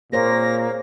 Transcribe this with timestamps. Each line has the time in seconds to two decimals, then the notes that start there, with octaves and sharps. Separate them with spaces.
0.12 A#2 A#3 G#4 C5 C#5 A#6